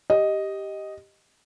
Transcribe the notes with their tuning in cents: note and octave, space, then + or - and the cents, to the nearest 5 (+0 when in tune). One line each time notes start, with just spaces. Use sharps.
G4 +0 D#5 +0